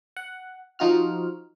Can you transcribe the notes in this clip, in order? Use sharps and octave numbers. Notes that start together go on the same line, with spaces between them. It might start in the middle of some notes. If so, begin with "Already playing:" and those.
F#5
F3 D#4 F4 F#4 F6